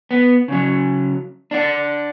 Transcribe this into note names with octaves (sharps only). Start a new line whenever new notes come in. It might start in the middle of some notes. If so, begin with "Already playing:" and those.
B3
C#3 F#3
D4 D5 F#5